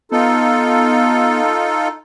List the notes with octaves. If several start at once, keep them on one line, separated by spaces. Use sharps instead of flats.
B3 D#4 F4 A4